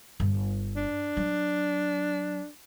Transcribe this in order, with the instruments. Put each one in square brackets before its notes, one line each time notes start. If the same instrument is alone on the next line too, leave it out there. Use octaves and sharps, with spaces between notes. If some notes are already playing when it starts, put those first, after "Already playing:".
[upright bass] G1
[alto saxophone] D4
[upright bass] F#3